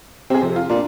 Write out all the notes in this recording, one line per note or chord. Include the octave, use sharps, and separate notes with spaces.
C3 C4 G#4
F2 C3
F4
A#2 D4